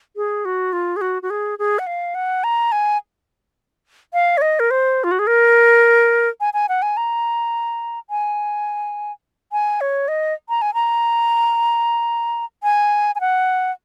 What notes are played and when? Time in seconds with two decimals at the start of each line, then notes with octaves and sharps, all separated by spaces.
0.16 G#4
0.45 F#4
0.73 F4
0.96 G#4
1.01 F#4
1.23 F#4
1.30 G#4
1.59 G#4
1.79 F#5
1.87 F5
2.15 F#5
2.44 A#5
2.72 G#5
4.13 F5
4.37 C#5
4.42 D#5
4.60 A#4
4.71 C5
5.04 F4
5.11 F#4
5.19 G#4
5.27 A#4
6.41 G#5
6.54 G#5
6.69 F#5
6.82 G#5
6.97 A#5
8.10 G#5
9.52 G#5
9.81 C#5
10.08 D#5
10.49 A#5
10.62 G#5
10.74 A#5
12.63 G#5
13.15 G#5
13.21 F#5